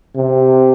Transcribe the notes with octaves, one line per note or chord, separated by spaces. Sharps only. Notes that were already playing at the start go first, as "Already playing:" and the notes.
C3